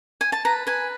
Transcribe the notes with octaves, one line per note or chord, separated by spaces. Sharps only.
G#5
A5
B4 A#5
B4 G#5